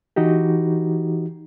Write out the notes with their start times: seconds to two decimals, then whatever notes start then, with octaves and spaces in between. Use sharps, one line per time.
0.16 E3 D#4 F#4 G4